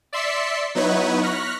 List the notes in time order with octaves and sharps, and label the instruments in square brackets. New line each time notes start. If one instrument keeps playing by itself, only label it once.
[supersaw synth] D5 E5 C6 E6 B6 C#7
F#3 B3 D#4 E4 B4 C#5
C#6 F6 F#6 A#6 B6